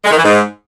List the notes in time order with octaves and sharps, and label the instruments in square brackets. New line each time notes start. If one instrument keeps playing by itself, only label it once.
[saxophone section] G#3
D#3
E3
G#2